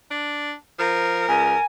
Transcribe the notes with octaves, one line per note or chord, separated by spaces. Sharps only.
D4
F3 A#4
C#2 G#5